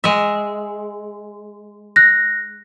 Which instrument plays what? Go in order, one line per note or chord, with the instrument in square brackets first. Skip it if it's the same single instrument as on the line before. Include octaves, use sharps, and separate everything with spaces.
[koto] G#3 E5
[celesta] F#6 A#6